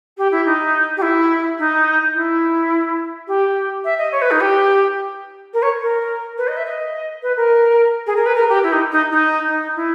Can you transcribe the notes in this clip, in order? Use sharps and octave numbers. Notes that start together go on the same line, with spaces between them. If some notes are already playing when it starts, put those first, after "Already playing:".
G4
E4
D#4
G4
E4
D#4
E4
G4
E5
D#5
C#5
B4
D#4
G4
A#4
C#5
A#4
B4
D#5
E5
D#5
B4
A#4
G#4
A#4
B4
A#4
G4
E4
D#4
D#4
D#4
D#4
E4